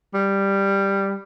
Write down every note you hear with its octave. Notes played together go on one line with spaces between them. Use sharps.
G3